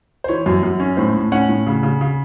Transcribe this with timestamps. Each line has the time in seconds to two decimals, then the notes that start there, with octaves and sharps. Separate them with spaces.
0.24 C5
0.28 E3 C#5
0.46 F#2
0.63 F#2
0.80 C#4
0.97 A2 C5
1.15 A2
1.32 C#4 F#5
1.49 A2
1.66 C#3
1.83 C#3
2.01 C#3